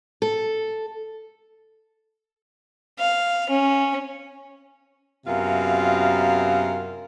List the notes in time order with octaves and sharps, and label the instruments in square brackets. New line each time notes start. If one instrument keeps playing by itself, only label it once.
[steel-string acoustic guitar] A4
[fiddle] F5
C#4
[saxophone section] F#2 C3 B3 F4 A#4 F5